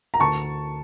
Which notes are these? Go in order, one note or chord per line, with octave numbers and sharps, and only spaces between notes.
A#5
D2 A5 C#6